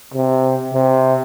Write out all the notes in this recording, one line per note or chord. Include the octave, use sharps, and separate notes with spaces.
C3
C3